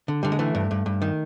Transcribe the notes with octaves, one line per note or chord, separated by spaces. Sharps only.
D3
D3 G3
G#3
E3 A3
G2
G2
G2
D#3